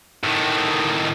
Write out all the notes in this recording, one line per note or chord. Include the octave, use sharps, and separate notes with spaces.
A2 D#3